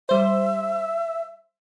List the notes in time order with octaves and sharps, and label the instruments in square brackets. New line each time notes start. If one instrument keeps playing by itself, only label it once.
[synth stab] G3 C5 [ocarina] E5